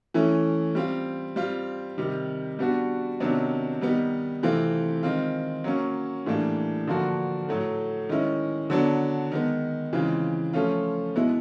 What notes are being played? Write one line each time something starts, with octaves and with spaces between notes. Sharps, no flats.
E3 A3 C#4 E4
G3 C4 F4
G3 C4 F4
C3 D#3 G3
G3 B3 D4 F#4
C3 D#3 F#3 B3 D4
D#3 G3 B3 D#4
C3 E3 A3 C4 F4
D#3 G#3 C4 F4
F#3 A#3 C#4
A2 E3 G3 A#3 D4
D3 F3 A#3 D4 F#4
A2 F#3 A3
D#3 G#3 C#4 E4
D3 F#3 B3 D4
D#3 G#3 B3
C#3 E3 G#3 C4 F4
F3 A3 C#4 F4
B2 G#3 B3 E4